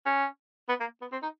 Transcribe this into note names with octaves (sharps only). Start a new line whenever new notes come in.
C#4
B3
A#3
B3
C4
D#4